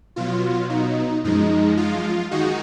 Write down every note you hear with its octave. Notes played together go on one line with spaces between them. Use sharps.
B2 F#3 F4
D#4
F#2 F3 G#3 D#4
F4
D#3 G#3 D#4 F#4